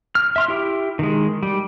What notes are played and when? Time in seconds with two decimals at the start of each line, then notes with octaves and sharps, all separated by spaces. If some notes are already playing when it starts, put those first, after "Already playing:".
0.15 F6
0.36 E5 C6 F6
0.48 E4 G4
0.99 D#3 G#3
1.43 G3